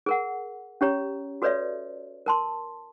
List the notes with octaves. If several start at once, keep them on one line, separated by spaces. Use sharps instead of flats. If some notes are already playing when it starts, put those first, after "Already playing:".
G#4 A#4 F#5
C#4 G4 C#5 A#5
F#4 A4 B4 C#5 D5 E5
A#4 A5 C6